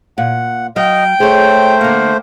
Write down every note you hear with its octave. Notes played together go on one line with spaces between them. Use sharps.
A#2 F#5
F#3 D#5 F5 G5
A3 G#4 C5 C#5
D3 A#3 F#5